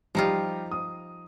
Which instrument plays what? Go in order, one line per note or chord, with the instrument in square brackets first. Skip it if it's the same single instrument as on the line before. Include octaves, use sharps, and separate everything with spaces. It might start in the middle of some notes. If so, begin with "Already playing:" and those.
[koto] F3 D#4 F4 [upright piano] G3 G4
[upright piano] D#6